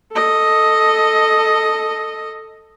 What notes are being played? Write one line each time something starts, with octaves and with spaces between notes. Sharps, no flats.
A4 D#5